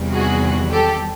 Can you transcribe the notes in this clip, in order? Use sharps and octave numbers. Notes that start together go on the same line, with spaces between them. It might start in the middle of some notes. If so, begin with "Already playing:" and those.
Already playing: E2 C3 D#3 G3
F#4 G#4
G4 A4